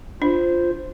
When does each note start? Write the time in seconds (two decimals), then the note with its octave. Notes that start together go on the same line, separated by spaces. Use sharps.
0.22 D4 F4 C5